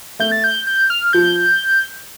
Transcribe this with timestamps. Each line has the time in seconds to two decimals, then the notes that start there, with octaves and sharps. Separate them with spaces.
0.20 A3 G6
0.32 A6
0.44 G6
0.67 G6
0.90 F6
1.13 F3 G6